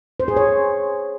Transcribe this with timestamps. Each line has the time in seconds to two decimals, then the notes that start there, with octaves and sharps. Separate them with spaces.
0.20 C5
0.28 G#4
0.37 C#5